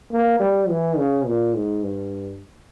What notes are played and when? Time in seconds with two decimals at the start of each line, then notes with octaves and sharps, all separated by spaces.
0.12 A#3
0.40 G3
0.69 E3
0.98 C#3
1.26 A#2
1.55 G#2
1.83 G2